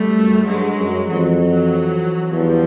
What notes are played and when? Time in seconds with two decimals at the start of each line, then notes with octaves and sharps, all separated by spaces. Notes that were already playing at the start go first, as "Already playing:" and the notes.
Already playing: G3 A3
0.15 F#2
0.46 G2 F#3 G#3
0.77 F#2
1.08 F2 E3 F#3
1.39 E3 F#3
2.32 E2 F3 G3